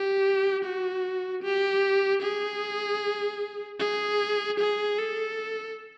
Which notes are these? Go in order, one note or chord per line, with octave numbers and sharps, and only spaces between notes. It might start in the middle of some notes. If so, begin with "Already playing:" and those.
Already playing: G4
F#4
G4
G#4
G#4
G#4
A4